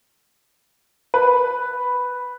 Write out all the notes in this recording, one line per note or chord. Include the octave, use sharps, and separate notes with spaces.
B4